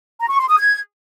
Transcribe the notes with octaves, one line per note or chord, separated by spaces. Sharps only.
A#5
C#6
C6
D#6
G#6